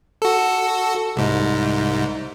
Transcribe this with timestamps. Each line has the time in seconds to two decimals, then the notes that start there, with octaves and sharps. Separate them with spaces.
0.22 F#4 A4
1.16 C2 G#2